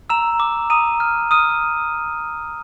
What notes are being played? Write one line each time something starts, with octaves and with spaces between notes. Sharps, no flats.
A#5 E6 E7
D6
A#5 D#6 D#7
F6
D#6 F6 D#7